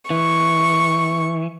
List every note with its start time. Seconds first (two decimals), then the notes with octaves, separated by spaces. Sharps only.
0.10 E3 C#6